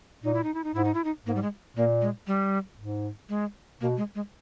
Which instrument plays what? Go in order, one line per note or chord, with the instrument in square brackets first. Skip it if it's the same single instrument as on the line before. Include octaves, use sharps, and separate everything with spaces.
[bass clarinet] A#2 [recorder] D#4
[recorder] E4
D#4
E4
D#4
[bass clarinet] G#2 [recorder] E4
[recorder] D#4
E4
D#4
[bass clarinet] G#2 [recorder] A#3
[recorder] G3
G#3
[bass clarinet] A#2 [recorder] A#3
[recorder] G#3
G3
[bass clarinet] G#2
[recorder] G#3
[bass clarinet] B2 [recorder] A#3
[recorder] G#3
G#3